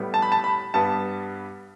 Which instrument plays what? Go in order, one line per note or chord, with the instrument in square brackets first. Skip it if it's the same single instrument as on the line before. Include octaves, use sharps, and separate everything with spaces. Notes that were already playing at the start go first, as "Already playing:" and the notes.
Already playing: [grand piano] A2 G3 B3
A5
B5
A5
B5
G2 G3 B3 A5